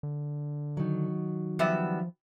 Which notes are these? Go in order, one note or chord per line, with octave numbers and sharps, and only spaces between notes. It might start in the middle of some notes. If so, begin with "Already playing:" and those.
D3
D#3 F#3
F3 G3 B3 E5